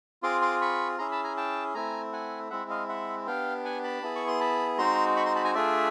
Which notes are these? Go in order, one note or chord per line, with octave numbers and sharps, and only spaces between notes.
C4 F4 G#4 C6 D6
C6 D6
B5 C#6
C#4 E4 G#4 A#5 C6
A5 B5
G#5 A#5
G5 A5
A3 C4 E4 G#5 A#5
F#5 G#5
G#3 C4 E4 E5 F#5
D#5 F5
E5 F#5
B3 D4 G4 F5 G5
F#5 G#5
A5 B5
B3 E4 G#4
C#6
C6
A5 B5
G#3 C4 D#4 F#4 A#5 C6
B5 C#6
A#5 C6
A5 B5
G#5 A#5
A3 D4 F4 G#4 D5 E5